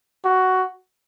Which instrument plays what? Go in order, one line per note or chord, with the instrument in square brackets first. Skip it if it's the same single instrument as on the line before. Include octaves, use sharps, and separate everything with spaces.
[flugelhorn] F#4